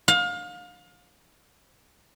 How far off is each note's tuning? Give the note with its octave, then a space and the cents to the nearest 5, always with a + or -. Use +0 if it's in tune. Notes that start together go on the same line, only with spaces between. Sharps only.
F5 +30